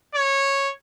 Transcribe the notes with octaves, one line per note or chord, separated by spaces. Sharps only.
C#5